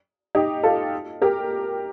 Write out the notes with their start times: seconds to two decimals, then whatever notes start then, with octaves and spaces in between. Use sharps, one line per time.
0.35 D#4 G4
0.63 F4 A4
1.22 G4 A#4